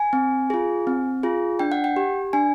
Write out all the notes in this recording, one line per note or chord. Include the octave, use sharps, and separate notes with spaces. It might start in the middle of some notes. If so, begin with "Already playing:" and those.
Already playing: G#5
C4
F4 G#4
C4
F4 G#4
D4 G5
F#5
G5
G4
D4 G#5